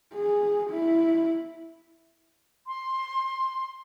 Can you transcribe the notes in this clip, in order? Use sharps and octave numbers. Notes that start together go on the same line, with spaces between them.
G#4
E4
C6